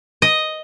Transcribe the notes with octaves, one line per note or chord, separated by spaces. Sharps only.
D#5